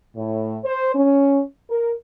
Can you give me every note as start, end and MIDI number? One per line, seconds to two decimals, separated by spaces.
0.16 0.57 45
0.64 0.91 72
0.94 1.41 61
1.70 1.91 70